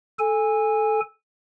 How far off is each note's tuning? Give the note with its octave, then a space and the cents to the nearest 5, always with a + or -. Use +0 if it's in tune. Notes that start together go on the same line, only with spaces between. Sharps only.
A4 -10 G#5 -15